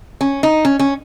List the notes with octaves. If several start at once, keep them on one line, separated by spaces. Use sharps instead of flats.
C#4
D#4
C#4
C#4